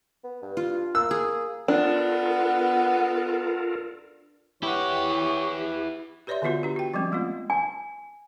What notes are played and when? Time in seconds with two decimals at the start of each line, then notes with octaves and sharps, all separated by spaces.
0.24 B3
0.42 G2
0.57 F4
0.95 A#3 E6
1.11 G#4
1.68 B3 D4 F4 A4 A#4
4.63 E3 E4 G4 C#5 F#5
6.27 G4 B4 C#5 D5 E5 C6
6.42 D3 E3 B3 F4 F#4 B4
6.63 D4 G4
6.76 F#4 G5
6.94 F3 G3 G#3 C4 C#4
7.12 G#3 A3 B3 F4
7.50 G#5